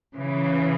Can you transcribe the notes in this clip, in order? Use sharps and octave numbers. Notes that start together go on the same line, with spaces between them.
C#3 E3